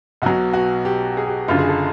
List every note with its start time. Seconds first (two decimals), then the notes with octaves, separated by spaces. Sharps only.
0.22 B1 B2 F#3 F#4
0.53 F#4
0.85 G4
1.17 G#4
1.27 G4
1.48 F#1 F#2 D3 F4
1.59 G#4
1.69 A4